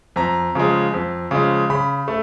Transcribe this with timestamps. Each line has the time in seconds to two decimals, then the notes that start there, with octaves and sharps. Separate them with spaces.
0.16 F2 A#5
0.55 C#3 F3 G#3
0.93 F2
1.31 C#3 F3 G#3
1.70 C#3 B5
2.08 A3